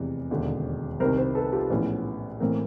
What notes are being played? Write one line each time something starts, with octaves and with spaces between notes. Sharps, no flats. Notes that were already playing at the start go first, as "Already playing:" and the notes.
Already playing: F1 E2 C3 E3
E1 D#2 D3
C2 C3 D#3 A#4 C5
A#4 C5
A4 B4
F4 G4
A#1 A2 E3 B3 C#4
A1 A2 E3 A#3 C4